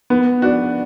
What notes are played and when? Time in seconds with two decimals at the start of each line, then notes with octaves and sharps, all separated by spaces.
0.10 B3
0.42 D4 F#4